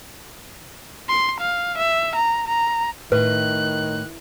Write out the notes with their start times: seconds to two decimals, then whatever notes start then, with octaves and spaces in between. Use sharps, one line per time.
1.09 C6
1.41 F5
1.78 E5
2.16 A#5
2.48 A#5
3.12 A2 D#3 B4 F#6